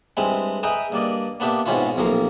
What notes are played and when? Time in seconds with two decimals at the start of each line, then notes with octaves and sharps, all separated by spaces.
0.17 G2 G#3 C4 E4
0.63 G#4 B4 D#5 E5 G5 A#5
0.92 G2 A#3 D5 D#5
1.40 A#3 B3 D4 G4 E5
1.66 G#2 B2 C4 C#4 E4 F4
1.96 B1 C3 F3 A#3 A#4 F5